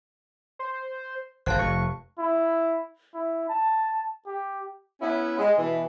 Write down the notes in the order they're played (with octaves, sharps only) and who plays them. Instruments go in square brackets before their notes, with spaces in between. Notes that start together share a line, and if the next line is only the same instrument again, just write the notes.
[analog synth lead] C5
[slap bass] G#1 [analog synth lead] C5 [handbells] F5 A5 F#6
[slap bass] F1 [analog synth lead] C#6
[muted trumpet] E4
E4
A5
G4
[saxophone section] B3 C#4 E4
G#3
B2 E3